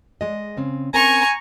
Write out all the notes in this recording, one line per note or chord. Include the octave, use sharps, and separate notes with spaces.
G#3 D#5
C#3 C4 C#4
C4 C#4 A#4 G#5 A#5 C#6